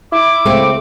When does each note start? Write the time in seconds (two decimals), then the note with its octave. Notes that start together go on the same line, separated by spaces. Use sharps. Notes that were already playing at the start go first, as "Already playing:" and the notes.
0.12 E4 D6
0.46 C#2 A3 C4